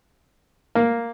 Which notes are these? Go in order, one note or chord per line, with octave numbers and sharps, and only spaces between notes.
A#3